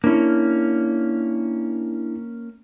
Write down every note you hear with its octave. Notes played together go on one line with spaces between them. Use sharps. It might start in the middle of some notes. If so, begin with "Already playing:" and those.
A#3 C#4 D4 E4